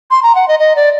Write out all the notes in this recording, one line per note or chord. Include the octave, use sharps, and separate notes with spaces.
C6
A#5
F#5
D#5
D#5
D5